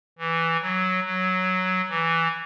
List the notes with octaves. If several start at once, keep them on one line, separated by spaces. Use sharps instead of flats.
E3
F#3
F#3
E3